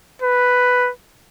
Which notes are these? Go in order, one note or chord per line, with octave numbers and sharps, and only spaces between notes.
B4